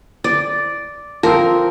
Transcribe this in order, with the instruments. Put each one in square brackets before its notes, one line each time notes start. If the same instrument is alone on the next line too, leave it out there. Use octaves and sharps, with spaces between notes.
[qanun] D5
[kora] F3 C4 [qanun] A#4